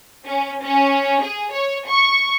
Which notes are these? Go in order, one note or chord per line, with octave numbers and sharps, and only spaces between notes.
C#4
C#4
G#4
C#5
C#6